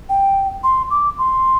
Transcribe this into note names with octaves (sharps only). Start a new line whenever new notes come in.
G5
C6
D6
C6